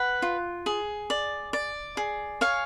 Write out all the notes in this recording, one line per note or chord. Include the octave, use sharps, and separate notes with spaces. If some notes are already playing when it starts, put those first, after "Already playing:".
Already playing: B4 F#5
F4
G#4
D5
D5
G#4
C#5 F5 G#5